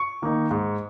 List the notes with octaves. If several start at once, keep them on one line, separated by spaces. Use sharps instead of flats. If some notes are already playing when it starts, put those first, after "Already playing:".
Already playing: C#6
D#3 A#3 D#4
G#2